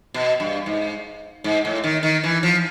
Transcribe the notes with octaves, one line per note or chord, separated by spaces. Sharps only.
B2
G2
G#2
G#2
A2
D#3
D#3
E3
F3